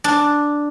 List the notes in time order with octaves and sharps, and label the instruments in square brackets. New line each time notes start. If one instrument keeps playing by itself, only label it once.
[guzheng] D4